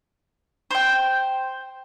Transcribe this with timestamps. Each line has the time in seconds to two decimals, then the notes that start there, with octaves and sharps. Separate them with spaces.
0.71 C5 G5